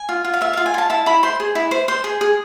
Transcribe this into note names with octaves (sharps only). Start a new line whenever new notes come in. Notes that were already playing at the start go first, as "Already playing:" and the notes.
Already playing: G#5
F4
F4
F5
F4 E5
F4 F5
G#5
F4 A5
E4 A5
E4 B5
C5 C6
G#4
E4
C5
C5 C6
G#4
G#4